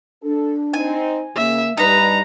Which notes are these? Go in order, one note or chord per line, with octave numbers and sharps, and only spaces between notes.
D4 A4
C4 D#4 G#5
C#3 A#3 E5
G2 G3 D#4 B4 A#5